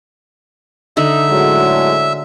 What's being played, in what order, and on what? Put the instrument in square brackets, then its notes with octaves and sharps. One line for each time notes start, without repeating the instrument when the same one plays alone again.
[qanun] D3 D#4 [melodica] E5
[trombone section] A2 F#3 G#3